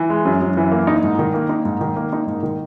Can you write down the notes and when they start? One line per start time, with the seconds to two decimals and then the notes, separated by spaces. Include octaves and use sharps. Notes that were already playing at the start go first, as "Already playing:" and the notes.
Already playing: E3
0.10 G#3
0.25 F#2
0.42 F#2
0.57 E3
0.72 A#3
0.87 D#4
1.03 G#2
1.19 D#3
1.34 A#3
1.49 D#4
1.65 G#2
1.81 D#3
1.96 A#3
2.13 D#4
2.27 G#2
2.43 D#3